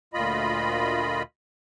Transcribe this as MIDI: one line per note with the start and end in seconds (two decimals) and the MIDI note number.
0.14 1.23 38
0.14 1.23 46
0.14 1.23 65
0.14 1.23 75
0.14 1.23 83